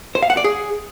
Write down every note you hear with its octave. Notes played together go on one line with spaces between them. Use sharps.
C5
F5
F#5
D5
G#4